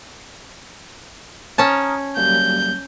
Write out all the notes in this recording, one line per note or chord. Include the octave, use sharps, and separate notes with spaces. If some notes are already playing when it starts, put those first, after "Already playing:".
C#4 A5 A#5 D#6 F6
F#3 G3 A#3 G6